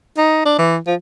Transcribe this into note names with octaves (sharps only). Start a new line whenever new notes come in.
D#4
D4
E3
F3